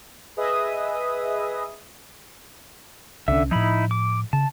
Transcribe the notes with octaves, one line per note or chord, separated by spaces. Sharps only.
G#4 B4 D#5 E5 D#6
C2 D3 C#4 E5
A2 F3 D#4 E4 B5
D6
C#3 A5